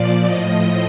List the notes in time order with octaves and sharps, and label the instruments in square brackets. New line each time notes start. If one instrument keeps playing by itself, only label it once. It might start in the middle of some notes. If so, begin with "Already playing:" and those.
Already playing: [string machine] A#2 F3 D5
A2 F3 D#5